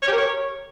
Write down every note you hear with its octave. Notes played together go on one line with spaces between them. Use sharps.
C#5
G4
A#4
C#5